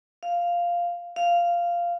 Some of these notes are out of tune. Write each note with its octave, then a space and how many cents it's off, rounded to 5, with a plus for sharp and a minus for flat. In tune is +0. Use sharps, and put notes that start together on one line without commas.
F5 -5
F5 -10